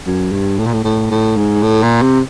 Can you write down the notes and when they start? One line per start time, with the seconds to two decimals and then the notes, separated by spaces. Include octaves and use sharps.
0.06 F#2
0.32 G2
0.58 A2
0.66 A#2
0.73 A2
0.84 A2
1.11 A2
1.37 G#2
1.63 A2
1.82 A#2
2.02 C3